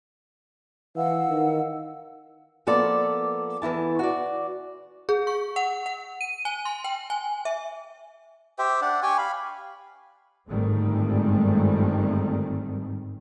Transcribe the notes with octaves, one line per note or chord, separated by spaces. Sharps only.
E3 F5 F#5 E6
D#3
F3 A#3 B3 A4 D5
E2 E3 E4 A5
F#4 D5
G#4
C#6
F#5
F#5
D#7
G#5
C6
G5
G#5
E5
G4 C5 E5 G5
D4 D5 F#5
G4 G5 G#5 C#6
F5 B5
G1 G#2 D#3 G3 A3 C4